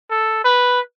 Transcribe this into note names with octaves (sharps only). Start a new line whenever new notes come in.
A4
B4